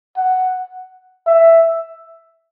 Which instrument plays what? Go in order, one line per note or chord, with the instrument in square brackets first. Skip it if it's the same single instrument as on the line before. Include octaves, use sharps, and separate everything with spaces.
[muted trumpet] F#5
E5